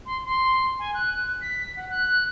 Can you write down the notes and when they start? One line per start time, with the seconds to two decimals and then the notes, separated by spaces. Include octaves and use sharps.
0.06 C6
0.26 C6
0.79 G#5
0.94 F#6
1.42 B6
1.76 F#5
1.90 F#6